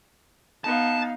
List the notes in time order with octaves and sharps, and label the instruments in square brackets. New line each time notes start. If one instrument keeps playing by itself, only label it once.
[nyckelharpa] B3 [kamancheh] D#4 F5 [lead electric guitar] A5